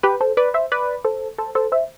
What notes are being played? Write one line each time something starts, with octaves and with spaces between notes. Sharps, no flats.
G4 B4
A4 C5
B4 D5
C5 E5
B4 D5
A4 C5
A4 C5
A4 C5
C5 E5